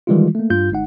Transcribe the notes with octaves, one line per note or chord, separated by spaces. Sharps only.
D#3 E3 G3 G#3 E4 F4
A3 A#3
G2 F4 G6
G1 G#3 D#4 F#5